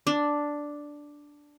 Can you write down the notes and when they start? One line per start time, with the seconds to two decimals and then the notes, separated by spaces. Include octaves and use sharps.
0.07 D4